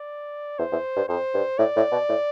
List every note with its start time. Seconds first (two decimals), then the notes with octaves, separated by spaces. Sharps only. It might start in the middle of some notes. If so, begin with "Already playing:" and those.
Already playing: D5
0.59 E2 C5
0.72 E2
0.96 G2
1.09 F2 C5
1.34 G2
1.58 A2 D5
1.76 A2
1.92 B2
2.09 A2